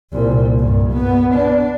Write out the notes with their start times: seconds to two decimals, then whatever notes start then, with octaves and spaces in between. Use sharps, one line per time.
0.12 C2 A#2
0.59 G2
0.93 B3
1.35 D4